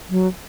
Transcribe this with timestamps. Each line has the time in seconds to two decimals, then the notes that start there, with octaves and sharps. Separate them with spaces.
0.10 F#3